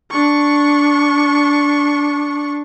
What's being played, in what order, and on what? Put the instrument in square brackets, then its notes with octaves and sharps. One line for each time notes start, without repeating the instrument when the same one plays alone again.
[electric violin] D4 C#6